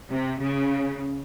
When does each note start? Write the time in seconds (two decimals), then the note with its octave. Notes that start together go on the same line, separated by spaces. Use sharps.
0.12 C3
0.42 C#3